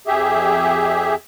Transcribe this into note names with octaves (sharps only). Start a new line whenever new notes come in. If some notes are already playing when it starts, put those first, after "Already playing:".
F2 G4 G#4 E5